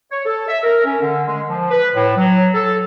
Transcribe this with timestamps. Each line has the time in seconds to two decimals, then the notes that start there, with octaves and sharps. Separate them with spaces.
0.11 C#5
0.26 A4
0.48 E5
0.64 A#4
0.85 C#4
1.02 D3
1.27 G#3
1.50 F3
1.71 B4
1.94 A2
2.17 F#3
2.54 A4